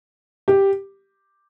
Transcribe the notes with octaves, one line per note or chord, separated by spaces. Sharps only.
G4